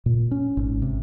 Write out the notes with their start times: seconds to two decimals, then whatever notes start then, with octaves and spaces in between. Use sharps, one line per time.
0.06 A#2
0.31 C#4
0.57 G#1
0.82 C3